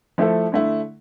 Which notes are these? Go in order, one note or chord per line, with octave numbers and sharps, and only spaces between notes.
F3 A3 E4 A4
D3 A3 E4